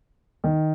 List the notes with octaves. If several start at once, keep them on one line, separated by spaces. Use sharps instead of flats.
D#3